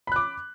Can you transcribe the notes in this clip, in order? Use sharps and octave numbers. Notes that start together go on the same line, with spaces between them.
B5 D6 F#6